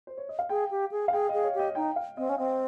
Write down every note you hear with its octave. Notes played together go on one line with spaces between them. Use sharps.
C5
C#5
D#5
F5
G#4 G5
G4
G#4
F5
G#4 G5
G#4 D#5
C#5
G4 D#5
D#4 G5
F5
C4 D#5
C#4
C4 D#5